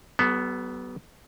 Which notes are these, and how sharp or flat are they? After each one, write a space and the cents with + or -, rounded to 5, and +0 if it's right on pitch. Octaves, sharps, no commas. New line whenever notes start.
F#3 +45 B3 +0 A4 -30